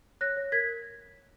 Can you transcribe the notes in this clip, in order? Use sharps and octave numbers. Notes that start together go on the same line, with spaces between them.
C#5 F#6 A#6
C#5
A#4 G#6 B6